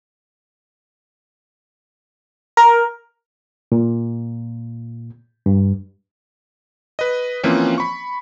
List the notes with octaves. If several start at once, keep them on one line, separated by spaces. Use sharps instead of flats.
A#4
A#2
G2
B4 D#5
E3 F3 A#3 C4 C#4
B5 C#6